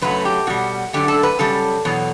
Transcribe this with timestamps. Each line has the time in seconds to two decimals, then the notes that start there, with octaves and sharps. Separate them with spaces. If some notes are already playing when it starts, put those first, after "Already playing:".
0.02 F#2 C#3 F#3 A3 B4
0.25 G4
0.47 B2 G3 F#4
0.93 F#2 D3 A3 G4
1.08 A4
1.23 B4
1.39 F#2 C#3 G3 A4
1.85 E2 B2 F#3